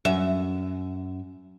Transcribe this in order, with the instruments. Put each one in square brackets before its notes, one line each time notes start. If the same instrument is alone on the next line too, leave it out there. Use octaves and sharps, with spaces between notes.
[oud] F#2 E5